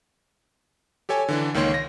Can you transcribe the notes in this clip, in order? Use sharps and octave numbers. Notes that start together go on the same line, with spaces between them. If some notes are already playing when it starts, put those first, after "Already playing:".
G4 A4 C#5 G#5
D3 E3 D4
C#2 D#3 A#3 C#5 C6
A#6